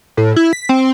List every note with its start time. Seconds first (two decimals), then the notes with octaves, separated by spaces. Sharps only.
0.17 A2
0.36 E4
0.53 B6
0.69 C4